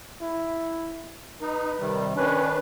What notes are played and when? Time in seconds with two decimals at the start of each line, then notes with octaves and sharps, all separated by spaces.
0.21 E4
1.41 D#4 B4
1.80 C3 D#3 G3
2.16 D#3 C#4 D4 B4